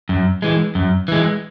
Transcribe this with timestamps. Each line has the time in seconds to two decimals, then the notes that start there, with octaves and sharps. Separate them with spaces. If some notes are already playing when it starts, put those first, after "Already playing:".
0.09 F#2
0.42 E3 G#3
0.75 F#2
1.08 E3 G#3